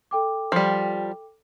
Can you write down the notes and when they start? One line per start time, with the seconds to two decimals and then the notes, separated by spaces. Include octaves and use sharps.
0.11 A4 G5 D6
0.52 F3 G3